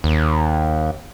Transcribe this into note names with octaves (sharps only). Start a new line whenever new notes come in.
D#2